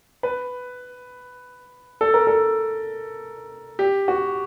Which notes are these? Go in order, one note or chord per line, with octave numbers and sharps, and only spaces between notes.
B4
A4
A#4
A4
G4
F#4